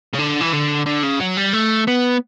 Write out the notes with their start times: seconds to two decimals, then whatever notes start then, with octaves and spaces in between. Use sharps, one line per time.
0.13 C#3
0.18 D3
0.41 E3
0.53 D3
0.86 D3
1.03 C#3
1.20 F#3
1.37 G3
1.53 A3
1.88 B3